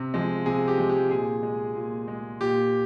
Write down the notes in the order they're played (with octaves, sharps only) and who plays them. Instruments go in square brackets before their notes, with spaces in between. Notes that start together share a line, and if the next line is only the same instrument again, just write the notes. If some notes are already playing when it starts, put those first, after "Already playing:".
Already playing: [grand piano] C3
F3 G#3
C3 G#4
G4
F3 G#3
G4
A#2 G#4
G#3
A#2
G#3
A#2 G4